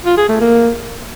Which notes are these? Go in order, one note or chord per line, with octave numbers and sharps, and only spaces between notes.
F4
G#4
A3
A#3